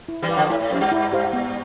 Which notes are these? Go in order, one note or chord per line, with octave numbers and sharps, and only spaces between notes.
E4
E3 G3
B4 F5
D3 F3
A2 E4
A2
F2 G4 C5 F5
G2
E4
G4 C5 F5
B3